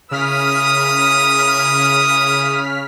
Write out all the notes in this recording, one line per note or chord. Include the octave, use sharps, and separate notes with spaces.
C#3 E4 A#4 D#6 F6 B6